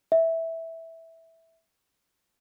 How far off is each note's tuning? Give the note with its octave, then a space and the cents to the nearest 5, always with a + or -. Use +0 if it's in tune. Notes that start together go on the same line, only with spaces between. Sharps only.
E5 -10